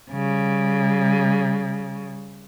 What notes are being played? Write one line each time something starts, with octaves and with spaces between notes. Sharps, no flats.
C#3 G3